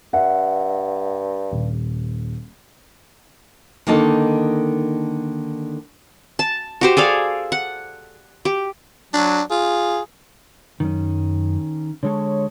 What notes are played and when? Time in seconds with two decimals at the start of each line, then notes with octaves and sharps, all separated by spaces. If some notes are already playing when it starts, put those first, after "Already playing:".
0.13 G2 E5 F#5
1.51 D#1
3.87 D3 D#3 A#3 D#4 A4
6.39 A5
6.81 F#4 G4 C5
6.97 G#4 A4 D5 F5
7.52 F#5
8.45 G4
9.14 F#3 D4
9.51 F4 G#4
10.80 F#2 D#3 C#4
12.03 D3 G#3 A4 C#5